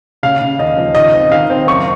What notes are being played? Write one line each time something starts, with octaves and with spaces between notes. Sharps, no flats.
C#3 F5
C#3
D#2 D#5
F3
D#3 D#5
C4
D#3 F5
C4
F#1 C#6